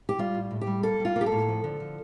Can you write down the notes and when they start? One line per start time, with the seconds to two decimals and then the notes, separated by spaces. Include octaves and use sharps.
0.09 G4
0.19 G3 F4
0.35 A2
0.51 A2
0.61 G4
0.67 G3
0.83 A#3 A4
1.00 G3 F4
1.16 A#3
1.21 G4
1.26 A4
1.32 A2
1.48 F3
1.64 D3
1.80 F3